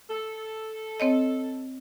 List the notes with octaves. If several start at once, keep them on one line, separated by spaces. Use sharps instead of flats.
A4
C4 C#5 D#5